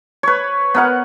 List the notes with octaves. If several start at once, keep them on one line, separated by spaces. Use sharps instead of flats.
B4 C#5
B3 A#4 F#5